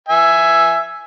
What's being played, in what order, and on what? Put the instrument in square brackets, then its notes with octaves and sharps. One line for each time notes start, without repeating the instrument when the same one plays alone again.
[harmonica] E5 G#5